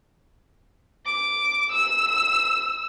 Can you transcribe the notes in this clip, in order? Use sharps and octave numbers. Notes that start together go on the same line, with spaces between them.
D6
E6